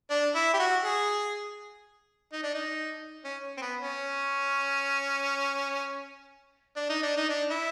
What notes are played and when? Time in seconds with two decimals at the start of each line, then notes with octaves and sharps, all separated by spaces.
0.10 D4
0.35 E4
0.54 G4
0.59 F#4
0.85 G#4
2.33 D#4
2.43 D4
2.54 D#4
3.25 C#4
3.57 C4
3.62 B3
3.81 C#4
6.76 D4
6.89 D#4
7.03 D4
7.17 D#4
7.30 D4
7.50 E4